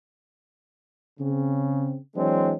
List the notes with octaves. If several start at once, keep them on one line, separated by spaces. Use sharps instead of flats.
C#3 C4
E3 F#3 G#3 C4 D4 C#5